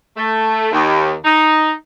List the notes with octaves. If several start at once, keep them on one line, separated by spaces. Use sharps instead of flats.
A3
D#2
D#4